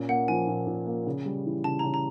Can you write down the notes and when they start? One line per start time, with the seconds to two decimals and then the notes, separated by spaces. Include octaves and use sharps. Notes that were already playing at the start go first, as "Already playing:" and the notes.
Already playing: A#2 C#4
0.09 A#3 F#5
0.28 F3 G#5
0.47 A#2
0.67 A#2
0.86 A#3
1.06 C#3
1.26 G3
1.46 E3
1.64 C#3 A5
1.79 C#3 A#5
1.94 A#5